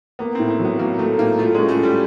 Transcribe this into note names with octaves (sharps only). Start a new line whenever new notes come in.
A#3 B3
A2 C4
C4
F#3
B3
F#3 A#3
F#3 A3
A2 A#3
A3 F4
G#3 C#4
A3
G3 F4